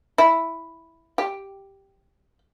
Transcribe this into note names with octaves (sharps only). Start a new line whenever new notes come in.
E4
G4